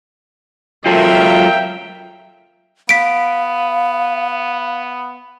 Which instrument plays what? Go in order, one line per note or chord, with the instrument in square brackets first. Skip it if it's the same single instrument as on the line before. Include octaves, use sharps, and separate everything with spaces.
[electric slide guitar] F#3 F4 A4 [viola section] A#4 E5 F5 [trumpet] G5
[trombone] B3 [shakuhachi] F5 [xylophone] B6 D7